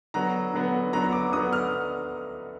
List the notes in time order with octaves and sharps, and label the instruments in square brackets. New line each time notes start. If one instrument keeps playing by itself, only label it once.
[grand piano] D3 F#3 B3 A#5
D3 F#3 B3
D3 F#3 B3 A#5
D6
D3 F#3 B3 D#6
F6